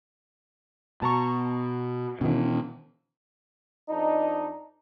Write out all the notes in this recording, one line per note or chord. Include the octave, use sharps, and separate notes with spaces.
B2 A5 A#5 C#6
B2 D#3 E3 C#4
F2 D4 D#4